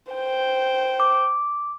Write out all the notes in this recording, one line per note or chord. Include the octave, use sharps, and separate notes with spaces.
C5 G5
D6